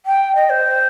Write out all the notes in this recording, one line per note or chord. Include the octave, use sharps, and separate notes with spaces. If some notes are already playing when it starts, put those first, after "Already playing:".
G5
D#5
C5